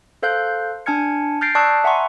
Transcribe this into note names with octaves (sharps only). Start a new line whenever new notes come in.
A4 C5 F5 F#6 G6
D4 G#5 A5 F6 G#6 C#7
F6 G6 A6 A#6 C7 D7
D5 A5 C#6 D#6 E6 F#6
E5 F#5 G#5 A#5 C6 C#6